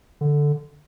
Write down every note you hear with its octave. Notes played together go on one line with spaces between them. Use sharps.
D3